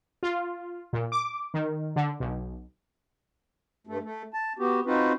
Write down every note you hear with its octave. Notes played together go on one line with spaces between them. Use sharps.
F4
A#2
D6
D#3
D3
B1
G2 A3
A3
A5
B3 F#4 G4
C4 D#4 F4 F#4 B4